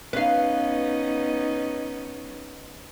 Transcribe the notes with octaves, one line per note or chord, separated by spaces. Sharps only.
B3 C#4 D#4 B4 F5